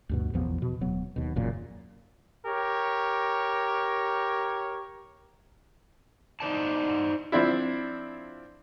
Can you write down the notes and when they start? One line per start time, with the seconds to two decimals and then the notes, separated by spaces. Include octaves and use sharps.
0.09 D2 G2 B2
0.34 A1 E2 F3 B3
0.62 B2
0.81 D1 F#3 B3
1.16 D#2 B2
1.36 E1 F#2 A#2 C#3
2.45 G4 A#4 C#5
6.40 D#4 C5 D5 A5
7.32 F3 C4 D4 E4